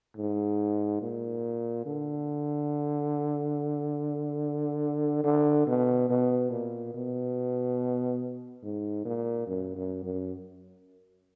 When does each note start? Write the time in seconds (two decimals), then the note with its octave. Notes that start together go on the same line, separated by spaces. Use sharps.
0.17 G#2
1.02 A#2
1.86 D3
5.24 D3
5.67 B2
6.10 B2
6.51 A#2
6.94 B2
8.63 G#2
9.05 A#2
9.47 F#2
9.76 F#2
10.04 F#2